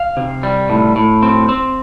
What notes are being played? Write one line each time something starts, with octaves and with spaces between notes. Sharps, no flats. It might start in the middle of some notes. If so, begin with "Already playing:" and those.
Already playing: F5
C3
G3
A2
A2
C4
C4